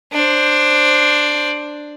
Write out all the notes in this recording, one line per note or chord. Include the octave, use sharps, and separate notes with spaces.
D4 C5